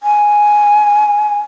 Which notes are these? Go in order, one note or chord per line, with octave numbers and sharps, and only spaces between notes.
G#5